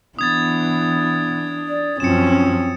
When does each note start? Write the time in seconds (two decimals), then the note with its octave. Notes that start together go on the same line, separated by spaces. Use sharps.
0.19 E3 B3 D4 D#6 G#6 A6
1.68 D5
2.00 F#2 F3 C4 C#4 C#7 E7